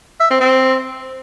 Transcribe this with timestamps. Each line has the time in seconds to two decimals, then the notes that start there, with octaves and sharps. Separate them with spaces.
0.20 E5
0.30 C4
0.40 C4